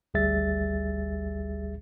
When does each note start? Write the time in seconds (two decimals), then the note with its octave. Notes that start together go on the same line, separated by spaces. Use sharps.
0.14 G#1 D2 G3 G#4 E5 A6